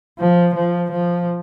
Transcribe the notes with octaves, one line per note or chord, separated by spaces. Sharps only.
F3
F3
F3